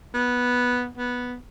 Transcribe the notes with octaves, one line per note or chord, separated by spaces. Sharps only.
B3
B3